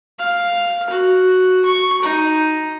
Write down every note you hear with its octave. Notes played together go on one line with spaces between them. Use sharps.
F5
F#4
C#6
D#4